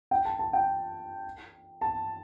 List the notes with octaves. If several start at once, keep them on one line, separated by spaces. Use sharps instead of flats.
G5
A5
A5
G5
A5